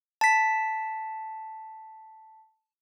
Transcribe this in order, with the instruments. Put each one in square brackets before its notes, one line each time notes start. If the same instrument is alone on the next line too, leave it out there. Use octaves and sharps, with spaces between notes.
[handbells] A5 B6